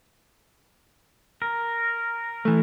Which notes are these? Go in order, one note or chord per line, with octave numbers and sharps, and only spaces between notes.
A#4
E3 A3